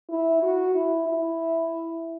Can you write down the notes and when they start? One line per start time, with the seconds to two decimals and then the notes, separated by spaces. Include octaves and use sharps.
0.10 E4
0.43 F#4
0.75 E4
1.08 E4